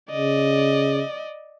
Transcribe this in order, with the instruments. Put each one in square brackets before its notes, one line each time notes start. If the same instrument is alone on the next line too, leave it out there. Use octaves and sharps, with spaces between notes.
[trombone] C#3 [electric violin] D5 D#5